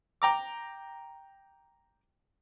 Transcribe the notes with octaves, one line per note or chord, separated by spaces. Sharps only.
G5 A#5 D6